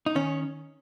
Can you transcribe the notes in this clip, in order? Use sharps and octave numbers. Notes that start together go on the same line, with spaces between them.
D#4
D#3 C#4